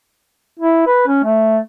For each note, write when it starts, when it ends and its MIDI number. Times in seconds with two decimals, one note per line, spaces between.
0.59 0.82 64
0.87 1.04 71
1.07 1.20 61
1.24 1.59 57